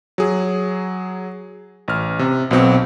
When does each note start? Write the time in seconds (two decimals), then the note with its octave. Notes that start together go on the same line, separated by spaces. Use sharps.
0.18 F#3 G#4
1.88 A1 F6
2.19 C3
2.51 B1 B2 C4 C#7